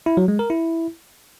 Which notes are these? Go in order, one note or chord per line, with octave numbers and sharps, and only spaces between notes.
E4
F#3
G#3
A#4
E4